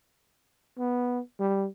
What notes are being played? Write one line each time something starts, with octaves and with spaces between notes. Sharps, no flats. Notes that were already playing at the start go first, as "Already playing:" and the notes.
B3
G3